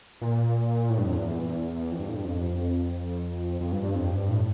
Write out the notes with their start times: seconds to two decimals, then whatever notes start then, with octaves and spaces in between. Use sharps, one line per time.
0.22 A#2
0.90 A2
0.98 G2
1.06 F2
1.15 E2
1.91 F2
1.99 G2
2.09 A2
2.17 G2
2.25 F2
3.61 F2
3.72 G2
3.83 G2
3.95 F2
4.12 G2
4.29 A2